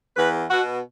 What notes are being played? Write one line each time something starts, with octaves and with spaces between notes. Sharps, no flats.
E2 B4
B2 F#4